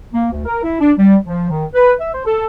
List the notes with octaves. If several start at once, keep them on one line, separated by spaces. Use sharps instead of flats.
A#3
D2
A#4
E4
D4
G3
F3
D#3
B4
E5
C5
A4